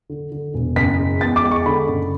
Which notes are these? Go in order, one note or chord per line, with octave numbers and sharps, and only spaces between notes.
D3
D3
E1
F#1 B6
G#3
E2 A6
D6
G#3
C#6
D3 B5
F#1